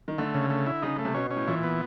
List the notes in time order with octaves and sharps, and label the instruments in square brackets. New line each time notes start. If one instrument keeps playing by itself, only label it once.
[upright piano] D#3
[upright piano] D3 [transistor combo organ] A3
[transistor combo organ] C#3
A3
E4
[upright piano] C#3 [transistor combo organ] D#4
[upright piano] C#3 [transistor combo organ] A3
[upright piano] C3
[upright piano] B2 [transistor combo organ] C#4
[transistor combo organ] C#4
[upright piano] A2
[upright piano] A#2 [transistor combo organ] E3
[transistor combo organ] B3